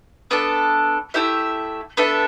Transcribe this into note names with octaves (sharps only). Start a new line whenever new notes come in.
B3 D4 A4
A3 E4 G4 E5
B3 D4 A4 E5